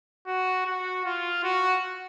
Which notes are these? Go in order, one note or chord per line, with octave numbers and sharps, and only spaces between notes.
F#4
F#4
F4
F#4